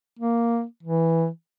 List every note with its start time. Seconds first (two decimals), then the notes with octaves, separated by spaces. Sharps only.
0.19 A#3
0.83 E3